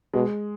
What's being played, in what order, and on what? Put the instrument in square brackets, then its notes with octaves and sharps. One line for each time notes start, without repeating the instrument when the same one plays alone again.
[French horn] B2 [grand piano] G#3